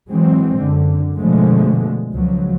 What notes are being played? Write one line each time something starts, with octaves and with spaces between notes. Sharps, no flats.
E3 F#3 G#3 C4
F#2 D3
B2 D3 F3 G#3 A3
C#2 F3 F#3